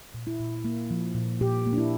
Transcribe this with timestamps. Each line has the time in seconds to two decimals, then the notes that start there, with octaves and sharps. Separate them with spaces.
0.14 A#2
0.27 E4
0.40 A#2
0.64 A#3
0.91 F3
1.15 A#2
1.41 A#2 G4
1.66 A#3
1.73 D4
1.78 E4